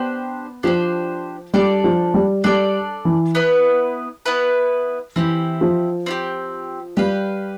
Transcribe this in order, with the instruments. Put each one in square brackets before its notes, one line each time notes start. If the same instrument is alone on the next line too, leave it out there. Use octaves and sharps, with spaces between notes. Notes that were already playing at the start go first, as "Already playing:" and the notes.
Already playing: [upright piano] B3 [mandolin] D4 G4 C5
[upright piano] F3 [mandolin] D4 G4 C5
[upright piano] G3 [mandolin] D4 A4 D5
[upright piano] F3
G3
[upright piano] G3 [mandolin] D4 A4 D5
[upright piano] E3
[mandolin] B3 E4 B4
B3 E4 B4
[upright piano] E3 [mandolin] C4 E4 G4
[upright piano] F3
[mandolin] C4 E4 G4
[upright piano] G3 [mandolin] G4 B4 F5